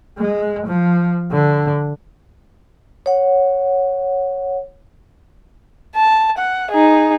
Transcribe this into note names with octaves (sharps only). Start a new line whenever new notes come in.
G#3
F3
D3
C#5 F#5
A5
F#5
D#4 G#4